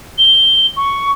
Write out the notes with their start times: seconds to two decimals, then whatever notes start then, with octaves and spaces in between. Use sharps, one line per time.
0.18 G7
0.77 C#6